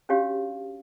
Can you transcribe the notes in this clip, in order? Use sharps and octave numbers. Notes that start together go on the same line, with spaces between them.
C#4 D4 F#4 G4 C#5 F5